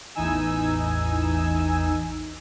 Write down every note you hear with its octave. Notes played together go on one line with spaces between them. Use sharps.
A1 E2 E3 D#4 G#5 E6